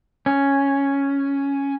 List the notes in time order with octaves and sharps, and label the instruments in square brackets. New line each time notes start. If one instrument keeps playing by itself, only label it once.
[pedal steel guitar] C#4